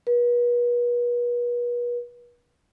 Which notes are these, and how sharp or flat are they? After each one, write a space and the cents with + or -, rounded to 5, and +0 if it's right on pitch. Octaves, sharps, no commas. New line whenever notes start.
B4 -40